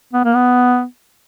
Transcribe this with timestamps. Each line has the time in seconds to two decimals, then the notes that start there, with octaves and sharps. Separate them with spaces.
0.13 B3
0.25 A#3
0.35 B3